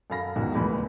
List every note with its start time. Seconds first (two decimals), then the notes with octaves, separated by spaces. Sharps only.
0.10 F#2 F#4 A4 F5 B5 A#6
0.36 E1 C#2 G#2 F#3
0.55 G1 D2 E3 A#3 B5